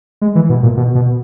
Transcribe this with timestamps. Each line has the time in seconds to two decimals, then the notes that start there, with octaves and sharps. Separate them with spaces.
0.22 G#3
0.35 E3
0.50 B2
0.63 A#2
0.77 B2
0.95 B2